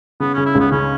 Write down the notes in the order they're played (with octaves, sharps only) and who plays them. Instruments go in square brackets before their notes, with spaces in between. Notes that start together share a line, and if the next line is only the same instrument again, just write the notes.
[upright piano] C#3 [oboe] B3
[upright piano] C#3 [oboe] C#4
[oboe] E4
[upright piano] C#2 [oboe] B3
[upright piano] C#3 [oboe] C#4